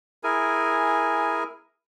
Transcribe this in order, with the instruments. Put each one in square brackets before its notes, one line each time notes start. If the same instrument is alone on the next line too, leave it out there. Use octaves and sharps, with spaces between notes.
[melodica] E4 G#4 A#4 G#5